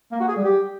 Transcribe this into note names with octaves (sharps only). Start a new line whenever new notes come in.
A#3
F#4
G#4
G3
G4